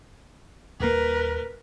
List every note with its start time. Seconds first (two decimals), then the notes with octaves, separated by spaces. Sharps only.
0.80 D#1 A#3 A#4 B4